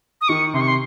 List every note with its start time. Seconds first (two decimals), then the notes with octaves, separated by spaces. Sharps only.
0.21 D#6
0.28 D#3 C#6
0.53 C3 C6
0.61 C#6
0.68 C6